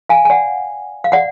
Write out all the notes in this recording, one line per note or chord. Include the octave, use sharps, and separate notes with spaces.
F5 G#5
G#5
D5 F#5
F5
D5 F#5